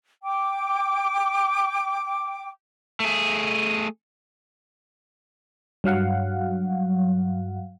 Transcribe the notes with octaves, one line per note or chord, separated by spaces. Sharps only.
G5 D6
A3 G#4
G2 F#3 F5 F#5